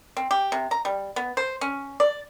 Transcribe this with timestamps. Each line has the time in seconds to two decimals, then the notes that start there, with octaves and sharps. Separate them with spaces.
0.17 C4
0.31 G4
0.52 C3
0.71 A#5
0.85 G3
1.16 B3
1.37 C5
1.61 C#4
2.00 D5